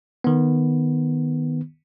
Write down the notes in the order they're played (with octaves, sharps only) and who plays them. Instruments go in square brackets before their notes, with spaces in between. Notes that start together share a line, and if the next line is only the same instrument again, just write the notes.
[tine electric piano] D#3 B3